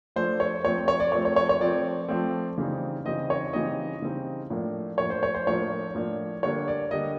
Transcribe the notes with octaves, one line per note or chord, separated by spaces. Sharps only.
F3 A3 D4 C5
C#5
F3 A3 C4 C#5
C#5
D5
F3 A3 C4 C#5
C#5
C#5
C#5
F3 A3 C4 D5
F3 A3 C4
C#3 E3 G3 C4 D#4
C#3 E3 G3 C4 D#4 D#5
C#5
C#3 E3 G3 C4 D#4 D#5
C#3 E3 G3 C4 D#4
A2 F3 A#3 D4
A2 F3 A#3 D4 C#5
C5
C#5
C5
A2 F3 A#3 D4 C#5
A2 F3 A#3 D4
D3 G3 A#3 C#5
D5
D3 G3 A#3 D#5